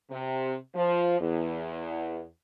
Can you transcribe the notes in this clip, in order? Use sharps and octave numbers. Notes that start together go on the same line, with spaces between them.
C3
F3
E2